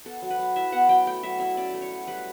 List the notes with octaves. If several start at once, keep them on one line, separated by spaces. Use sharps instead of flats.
B3 A4
F#3
B4
F#3
E4 E5
B3 F#5
F#3 G5
A3 G5
F#3 E5
E4 E5
C#4 D5
A3
C#5
F#3
G3 B4